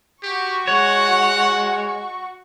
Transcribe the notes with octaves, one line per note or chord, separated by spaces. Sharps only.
F#4 G4 C#6
G#3 C#5 F#5